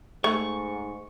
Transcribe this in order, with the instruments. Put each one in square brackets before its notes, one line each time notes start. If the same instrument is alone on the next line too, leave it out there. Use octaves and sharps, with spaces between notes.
[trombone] G#2 [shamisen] A3 [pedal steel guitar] C#6